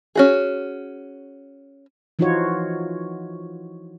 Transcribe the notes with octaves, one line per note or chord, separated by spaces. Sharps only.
C#4 F#4 G#4
E3 F3 D#4 F4 F#4 C#5